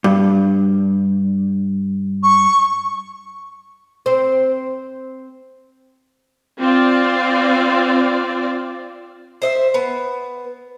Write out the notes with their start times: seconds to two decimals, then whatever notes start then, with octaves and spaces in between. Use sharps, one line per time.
0.04 G2
2.23 C#6
4.06 C4 C5
6.59 C4 F4 D5
9.42 C5 D#5 E5
9.74 B3